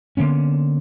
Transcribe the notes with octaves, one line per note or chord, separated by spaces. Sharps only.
D3 A#3 B3 C#4